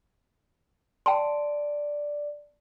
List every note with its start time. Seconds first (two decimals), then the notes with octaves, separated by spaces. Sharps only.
1.06 D5 G5 A5 C6